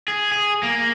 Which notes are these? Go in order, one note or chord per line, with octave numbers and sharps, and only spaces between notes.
G#4
G#4
A#3